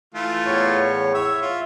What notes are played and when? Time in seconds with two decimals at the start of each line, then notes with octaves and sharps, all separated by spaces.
0.14 E3 A3 F4
0.46 E2 A2 C#5
1.14 C#5 E5 E6
1.42 F4